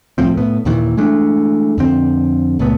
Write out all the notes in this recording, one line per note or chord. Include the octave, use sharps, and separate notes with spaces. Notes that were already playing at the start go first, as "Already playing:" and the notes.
C2 A2 F3 C4
A2 B3
D#2 A#2 D#3 E3
E3 G#3 A3 D4
F2 D3 C4
C#2 A#2 A3 B3